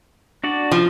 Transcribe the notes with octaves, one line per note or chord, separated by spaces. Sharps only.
D4 F#4 D5
F3